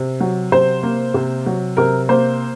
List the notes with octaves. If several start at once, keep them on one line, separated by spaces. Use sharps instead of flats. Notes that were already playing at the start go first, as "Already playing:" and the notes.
Already playing: C3
F#3
C3 C5
A#3
C3
F#3
C3 A#4
A#3 C5